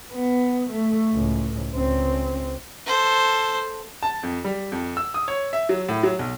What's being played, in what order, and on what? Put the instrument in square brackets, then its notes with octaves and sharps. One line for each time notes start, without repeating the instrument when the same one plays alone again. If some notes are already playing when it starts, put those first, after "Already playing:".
[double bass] B3
A3
C#2 A2
C#2 C4
[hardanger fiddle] A4 C5
[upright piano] A5
F2
G3
F2
E6
D#6
C#5
E5
F#3
A2
F#3
B1